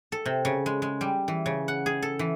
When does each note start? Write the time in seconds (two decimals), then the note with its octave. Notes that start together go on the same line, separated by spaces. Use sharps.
0.12 A4
0.26 C3
0.45 C#3
0.66 G#3
0.82 G#3
1.01 G3
1.28 E3
1.46 C#3
1.68 F#5
1.86 G#4
2.03 A4
2.19 E3